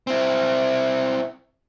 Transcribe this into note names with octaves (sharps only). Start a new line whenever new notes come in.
C4 E4